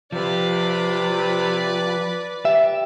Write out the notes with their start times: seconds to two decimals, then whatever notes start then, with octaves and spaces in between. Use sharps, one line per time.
0.12 C3 F3 B4 D5
2.45 G4 E5